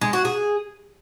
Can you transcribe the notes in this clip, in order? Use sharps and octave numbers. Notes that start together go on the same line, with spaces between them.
G#3
F#4
G#4